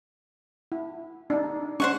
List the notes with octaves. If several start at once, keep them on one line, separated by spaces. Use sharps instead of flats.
E4
D4 D#4
C#4 D4 C5 F#5 C#6